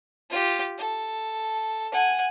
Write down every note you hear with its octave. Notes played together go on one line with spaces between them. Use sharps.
F4 G4
A4
F#5 G#5